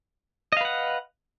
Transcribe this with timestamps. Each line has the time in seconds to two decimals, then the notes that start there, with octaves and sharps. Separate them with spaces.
0.52 D#5
0.57 F5
0.61 B4
0.65 F#5